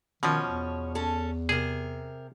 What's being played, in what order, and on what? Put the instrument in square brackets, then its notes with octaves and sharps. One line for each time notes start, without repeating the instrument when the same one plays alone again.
[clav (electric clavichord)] B2 F3 [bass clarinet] D#3 [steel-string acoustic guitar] C#4 C#5
[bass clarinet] E2
[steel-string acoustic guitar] C#4 A4
[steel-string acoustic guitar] C3 A#4 [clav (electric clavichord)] G#4